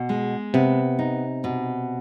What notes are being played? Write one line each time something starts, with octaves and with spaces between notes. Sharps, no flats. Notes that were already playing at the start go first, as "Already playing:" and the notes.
Already playing: B2
G#3
C3 B3
D#4
B2